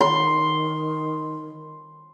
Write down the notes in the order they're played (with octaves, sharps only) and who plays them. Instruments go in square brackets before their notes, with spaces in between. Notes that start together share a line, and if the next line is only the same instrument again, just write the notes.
[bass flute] D#3 [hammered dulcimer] C6